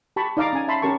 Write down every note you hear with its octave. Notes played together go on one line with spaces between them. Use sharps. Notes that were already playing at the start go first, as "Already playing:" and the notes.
G4 A5 B5 C#6
D#4 D5 D#5 F5 A#5 D6
C#4 G#5
E5 A5 B5 C6
C#4 G4 A#4 A5 C#6